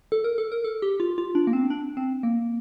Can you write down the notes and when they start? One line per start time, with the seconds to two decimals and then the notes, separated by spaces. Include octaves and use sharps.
0.12 A4
0.24 A#4
0.38 A4
0.52 A#4
0.64 A4
0.82 G4
1.00 F4
1.18 F4
1.35 D4
1.47 A#3
1.53 C4
1.70 D4
1.97 C4
2.23 A#3